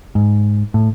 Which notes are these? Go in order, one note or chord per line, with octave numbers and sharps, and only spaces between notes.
G#2
A2